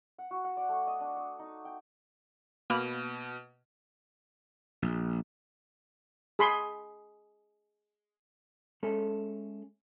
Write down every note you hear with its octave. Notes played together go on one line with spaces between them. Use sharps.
F#5
F#4
F#5
D5
A3
D#5
D4
D#6
D#4
G5
B2 A#3 B5 F6
A#1
G#4 B5 C6
G#3 A3 C#4 A4